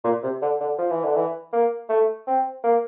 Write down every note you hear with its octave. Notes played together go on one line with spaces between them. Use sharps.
A#2
C3
D3
D3
F3
E3
D3
E3
A#3
A3
C4
A#3